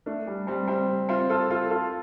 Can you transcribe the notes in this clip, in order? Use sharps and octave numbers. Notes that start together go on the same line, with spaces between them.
A3 D4
G3
G3 C4
G3 C4
C4 F4
F4 A4
F4 A4
F4 A4